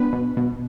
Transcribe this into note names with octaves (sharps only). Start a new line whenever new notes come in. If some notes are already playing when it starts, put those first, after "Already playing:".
Already playing: B3 D4 B4
B2
B2